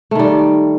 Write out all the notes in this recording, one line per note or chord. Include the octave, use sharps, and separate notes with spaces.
D#3 G3 A3